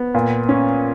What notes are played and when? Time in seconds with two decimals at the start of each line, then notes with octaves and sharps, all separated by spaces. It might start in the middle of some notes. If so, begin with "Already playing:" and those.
Already playing: B3
0.14 A#2
0.49 C#4